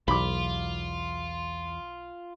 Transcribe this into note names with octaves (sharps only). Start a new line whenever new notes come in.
B1 E2 F4 B5 D6